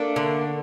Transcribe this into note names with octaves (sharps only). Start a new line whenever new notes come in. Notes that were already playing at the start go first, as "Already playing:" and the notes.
Already playing: A3 A#3 D4
D3